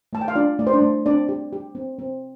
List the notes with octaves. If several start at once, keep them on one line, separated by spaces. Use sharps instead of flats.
A3 A5
G5
F5
D4 F4 D5
A3 D5
C5
D4 D5
A3
C4 D4 D5
G4
G4
C4
C4